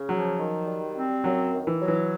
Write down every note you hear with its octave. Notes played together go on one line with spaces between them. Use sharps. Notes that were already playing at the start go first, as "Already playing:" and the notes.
Already playing: C#3
F3 F#3
D#3
G3
C4
F#2 F#3
D#3
E3
F#3
E3